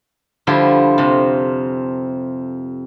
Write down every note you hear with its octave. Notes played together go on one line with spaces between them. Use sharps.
D3 F3 G3 E4 F4 G4
F2 C3